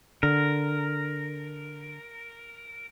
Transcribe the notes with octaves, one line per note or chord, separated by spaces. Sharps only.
D3 A#4